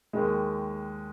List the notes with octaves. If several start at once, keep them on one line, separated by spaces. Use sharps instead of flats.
D#2 D#3 G#3